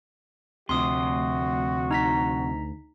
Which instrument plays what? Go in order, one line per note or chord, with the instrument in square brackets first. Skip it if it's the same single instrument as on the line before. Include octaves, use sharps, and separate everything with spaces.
[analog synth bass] D2 [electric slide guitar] C3 F3 [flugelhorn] F#4 [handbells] C6 D#6
[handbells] D#4 A#5 B6